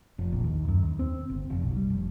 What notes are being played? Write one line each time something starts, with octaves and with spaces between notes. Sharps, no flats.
F1
A#1
D#2
F#2
D#2
C4
G1
F1
B1
G3
F1